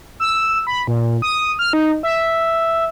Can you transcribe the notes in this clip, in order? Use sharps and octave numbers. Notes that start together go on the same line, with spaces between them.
E6
B5
A#2
D#6
F6
D#4
E5